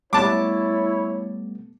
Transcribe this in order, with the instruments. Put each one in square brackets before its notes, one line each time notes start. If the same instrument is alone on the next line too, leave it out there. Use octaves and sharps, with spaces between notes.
[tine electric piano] G3 A3 B3 [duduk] E4 [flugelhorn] C#5 [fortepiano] A5 D6